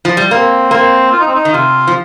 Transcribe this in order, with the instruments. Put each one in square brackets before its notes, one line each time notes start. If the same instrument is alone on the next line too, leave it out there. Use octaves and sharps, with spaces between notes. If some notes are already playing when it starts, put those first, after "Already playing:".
[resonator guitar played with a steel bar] F3
G3
[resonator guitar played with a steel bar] A#3 [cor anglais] C4
[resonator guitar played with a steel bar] A#3 [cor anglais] C4
[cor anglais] F4
D#4
C4
D#4
[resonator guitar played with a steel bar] D#3
[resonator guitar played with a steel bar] C3 [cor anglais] F4
[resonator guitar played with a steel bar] F3